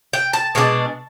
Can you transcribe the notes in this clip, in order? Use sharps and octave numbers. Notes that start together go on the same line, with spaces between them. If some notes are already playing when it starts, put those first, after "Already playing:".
G5
A5
B2 G#3 B3 D4